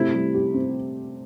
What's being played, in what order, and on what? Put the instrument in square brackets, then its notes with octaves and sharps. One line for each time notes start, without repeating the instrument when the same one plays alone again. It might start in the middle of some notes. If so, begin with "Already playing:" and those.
Already playing: [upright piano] C3 A3 [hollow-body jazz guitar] E4
[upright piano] G3
G4
C4